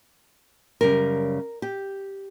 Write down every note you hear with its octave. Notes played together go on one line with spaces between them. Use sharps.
F#2 C#3 G3 A#4
G4